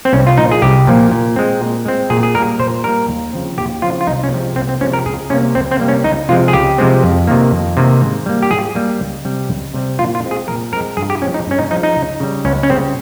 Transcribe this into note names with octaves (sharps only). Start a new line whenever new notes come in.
C4
C2 C#4
F4
A#2 F3 A#3 D#4
G#4
C2 G4
A#2 F3 A#3
A#2
G#3 C4
A#2
G#3 C4
A#2 G#4
G#4
G3 A#3 A#4
A#2 C5
G3 A#3 A#4
D#2
C#3 F3 C4
D#2 G4
C#3 F3 C4 F4
F4
C2 D#4
C#4
C3 F3 G#3 C4
C2 C4
C4
C3 F3 G#3 C4 C#4
A#4
C#2 G#4
C3 G3 A#3 C#4
C#2 C4
C4
C3 G3 A#3
C#4
C#2 D#4
C3 F3 G#3 C4 F4
G#4
C#2 G4
C3 F3 G#3 C4
F2
C3 D#3 A#3
F2
C3 D#3 A#3
G#2
G3 A#3
G4
G#2 G#4
G3 A#3
C#2
C3 G3 C4
C#2
C3 G3 C4
A#2 F4
F4
G#3 C4
G#4
A#2 A#4
G#3 C4 A#4
G2 G#4
G4
F3 G#3 C#4
D#4
G2 C#4
D#4
F3 G#3 D#4
D#4
C#2
C#3 G3
C#2 C#4
C#4
C#3 G3 C4